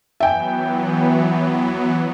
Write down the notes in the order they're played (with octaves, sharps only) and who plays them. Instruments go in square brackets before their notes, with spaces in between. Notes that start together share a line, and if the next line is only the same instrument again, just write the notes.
[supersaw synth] E3 F#3 B3 [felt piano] E5 G5 G#5